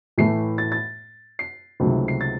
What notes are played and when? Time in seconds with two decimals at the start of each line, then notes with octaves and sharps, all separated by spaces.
0.18 A2 E3 A3 C7
0.58 A6
0.72 A6
1.39 C7
1.80 C#2 C3 D#3 F#3 A3
2.08 C7
2.21 A6